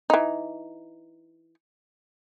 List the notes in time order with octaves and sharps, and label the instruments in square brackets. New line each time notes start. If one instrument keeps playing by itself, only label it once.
[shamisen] E3 D#4